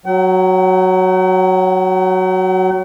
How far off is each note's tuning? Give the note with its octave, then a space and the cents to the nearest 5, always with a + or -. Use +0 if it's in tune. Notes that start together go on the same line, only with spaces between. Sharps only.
F#3 +0 F#5 +45